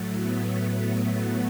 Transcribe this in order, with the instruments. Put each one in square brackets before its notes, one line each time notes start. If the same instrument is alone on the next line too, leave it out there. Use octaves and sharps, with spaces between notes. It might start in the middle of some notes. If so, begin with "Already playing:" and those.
Already playing: [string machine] A2 F#3 A3
B3
B3